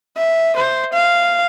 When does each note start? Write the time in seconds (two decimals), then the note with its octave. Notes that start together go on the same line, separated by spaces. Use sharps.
0.17 E5
0.56 C5
0.93 F5